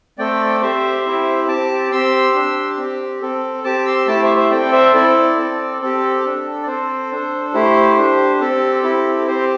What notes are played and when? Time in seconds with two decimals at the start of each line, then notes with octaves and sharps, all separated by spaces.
0.18 A3 C4 A4 D5 G5
0.61 C4 G4 C5 E5
1.05 C4 E4 G4
1.48 C4 G4 A5 D6
1.92 C4 G4 C6 E6
2.35 D4 G4
2.78 C4
2.83 G4
3.22 C4 A4
3.64 C4 G4 A5 D6
3.86 C6 E6
4.07 A3 E4 G4 A5 D6
4.23 C5 E5
4.37 C5 E5
4.51 C4 A4 D5 G5
4.72 C5 E5
4.94 C4 E4 A4 D5
5.37 C4 A4
5.81 C4 G4 A4
6.24 D4 A4
6.63 D5
6.67 C4 A4 C5
7.11 D4 A4
7.54 A3 E4 G4 C5
7.98 D4 G4
8.41 C4 G4 A4
8.83 C4 E4 G4
9.27 C4 G4 C5